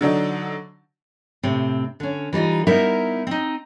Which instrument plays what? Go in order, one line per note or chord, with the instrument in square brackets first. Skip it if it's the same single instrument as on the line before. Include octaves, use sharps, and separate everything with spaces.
[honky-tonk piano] D3 F#3 D4 D#4
[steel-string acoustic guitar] A2 C3 C4
D3 C#4
E3 G3 D#4 F4
G3 B3 D#4 E4 A#4 E5
C4 D#4